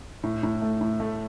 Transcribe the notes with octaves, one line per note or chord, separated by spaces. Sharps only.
A2
A2
A3
A2
A3